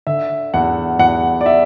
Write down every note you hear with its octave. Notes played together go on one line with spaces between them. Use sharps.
D3 E5
E2 F#5
E2 F#5
D5
E5